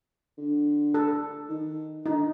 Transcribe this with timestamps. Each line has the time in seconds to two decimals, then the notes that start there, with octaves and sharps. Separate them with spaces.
0.38 D3
0.94 A4
1.49 D#3
2.05 D3 D#4